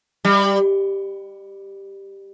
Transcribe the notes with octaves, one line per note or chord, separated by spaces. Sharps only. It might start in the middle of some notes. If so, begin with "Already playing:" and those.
G3